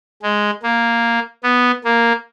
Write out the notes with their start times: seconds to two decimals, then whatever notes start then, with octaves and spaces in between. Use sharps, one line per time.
0.22 G#3
0.63 A#3
1.43 B3
1.84 A#3